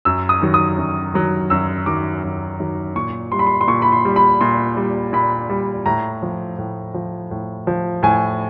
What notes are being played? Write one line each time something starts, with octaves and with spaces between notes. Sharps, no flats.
F#2 E6
D#6
D#3 F#3
D#6
F#2
D#3 F#3
F#2 E6
D#3 F#3 D6
F#2
D#3 F#3
A#2 C#6
G3 C6
B5
C6
C6
A#2 C#6
B5
C6
G3
B5
A#2 C6
G3
A#2 B5
G3
A2 A#5
F3
A2
F3
A2
F3
A2 G#5